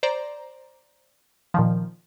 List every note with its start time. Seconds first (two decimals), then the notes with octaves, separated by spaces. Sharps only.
0.03 C5 D5 A#5
1.54 A#2 D#3 F3